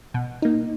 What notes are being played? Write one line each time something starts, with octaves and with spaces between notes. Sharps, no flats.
B2
A#3 D#4